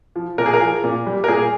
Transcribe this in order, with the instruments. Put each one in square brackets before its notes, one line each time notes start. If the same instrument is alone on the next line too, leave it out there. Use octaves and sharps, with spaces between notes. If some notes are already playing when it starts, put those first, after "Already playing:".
[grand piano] F3
A#2 A#4
G#4
A#4
F3
A#2
G3
A#4
A#2 G#4